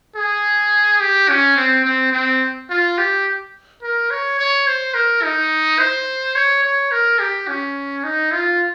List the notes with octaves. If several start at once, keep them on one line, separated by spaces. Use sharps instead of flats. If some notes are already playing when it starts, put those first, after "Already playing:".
G#4
G4
C#4
C4
C4
C4
F4
G4
A#4
C#5
C#5
C5
A#4
D#4
C5
C#5
C#5
A#4
G4
C#4
D#4
F4